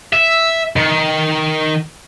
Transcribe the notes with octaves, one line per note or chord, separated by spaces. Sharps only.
E5
D#3